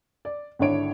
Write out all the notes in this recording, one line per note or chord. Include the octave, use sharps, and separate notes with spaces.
D5
G#1 D3 D4 E4 C#5 D7